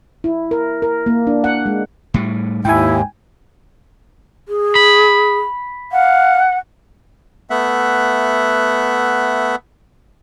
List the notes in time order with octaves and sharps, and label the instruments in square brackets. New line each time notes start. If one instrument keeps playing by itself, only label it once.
[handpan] E4
A#4
A#4
A#3
D4
F#5
G#3
[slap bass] A2 G3
[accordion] D#2 [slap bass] G#2 [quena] E4 [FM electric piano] G5 G#5
[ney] G#4
[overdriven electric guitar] B5
[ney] F5 [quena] F#5
[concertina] A3 B3 E5 F#5